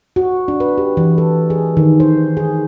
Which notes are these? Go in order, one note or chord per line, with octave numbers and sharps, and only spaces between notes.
F#4
D4
B4
G4
E3
A4
G#4
D#3
C5
G#4